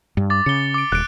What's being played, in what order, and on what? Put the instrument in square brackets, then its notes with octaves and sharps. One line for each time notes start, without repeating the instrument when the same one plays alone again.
[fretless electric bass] G2
[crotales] D6 A6
[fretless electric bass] C#3 [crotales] C#7 G7
[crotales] D6 D7
[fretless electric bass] D#1 [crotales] F#6 D7